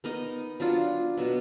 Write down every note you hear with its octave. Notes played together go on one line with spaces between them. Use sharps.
B3 D#4 A#4 D#5
F#3 D4 F4
B2 F#3 B3